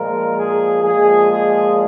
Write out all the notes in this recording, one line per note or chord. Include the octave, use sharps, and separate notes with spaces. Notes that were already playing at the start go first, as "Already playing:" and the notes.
Already playing: A#2 F3 G#3 A#4
G#4
A#2 F3 G#3 G#4
G#4